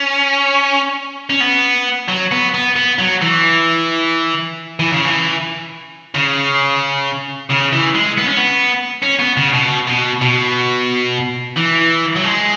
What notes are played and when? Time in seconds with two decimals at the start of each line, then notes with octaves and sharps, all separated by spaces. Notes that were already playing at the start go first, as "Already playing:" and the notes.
Already playing: C#4
1.30 C#4
1.40 B3
2.08 F#3
2.31 B3
2.54 B3
2.76 B3
2.99 F#3
3.22 E3
4.80 E3
4.92 C#3
5.05 E3
6.15 C#3
7.50 C#3
7.73 E3
7.95 G#3
8.18 B3
8.28 C#4
8.37 B3
9.03 C#4
9.20 B3
9.37 C#3
9.53 B2
9.87 B2
10.22 B2
11.57 E3
12.16 F#3
12.24 G#3